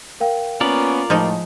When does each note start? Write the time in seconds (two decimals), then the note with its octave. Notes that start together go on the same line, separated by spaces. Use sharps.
0.20 A#4 F5 G5
0.61 A#3 B3 C#4 F4 A#4 D5 F#7
1.10 A2 F3 G#3 D#4